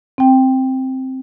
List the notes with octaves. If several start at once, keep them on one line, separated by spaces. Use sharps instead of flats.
C4 G5